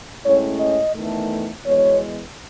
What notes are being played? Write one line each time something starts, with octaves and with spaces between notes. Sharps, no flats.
A2 G#3 C#4 C#5
D#5
E2 D#3 A3
E2 B2 G#3 C#5